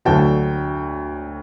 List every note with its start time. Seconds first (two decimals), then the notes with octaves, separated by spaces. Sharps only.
0.05 D2 D3 F#3 G5 A5